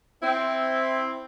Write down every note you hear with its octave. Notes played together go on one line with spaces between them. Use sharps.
C4 E4